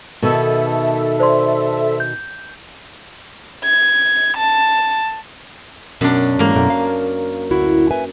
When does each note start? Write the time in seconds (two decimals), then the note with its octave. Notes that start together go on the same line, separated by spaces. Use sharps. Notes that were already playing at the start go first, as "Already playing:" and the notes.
0.22 B2 D#3 A4 E5
1.20 C5 D5 C6
2.00 G6
3.65 G#6
4.37 A5
6.01 F#2 B2 D4
6.39 G#2 E3 G#3 A#3 A#4
6.54 F#2 B2 A3
6.70 F5
7.51 D2 E4 F#4
7.91 B4 E5 G#5